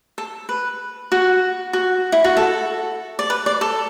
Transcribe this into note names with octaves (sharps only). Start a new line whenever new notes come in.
A4
B4
F#4
F#4
E4
F#4
A4
D5
B4
D5
A4